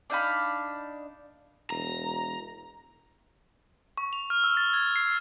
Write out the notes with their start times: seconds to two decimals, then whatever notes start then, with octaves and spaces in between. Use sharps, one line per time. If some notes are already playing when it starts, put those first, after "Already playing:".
0.10 D4 D#4 F5 B5
1.70 E1 A#5
3.97 C#6
4.13 F7
4.30 F6
4.44 E6
4.57 A6
4.73 G#6
4.96 C7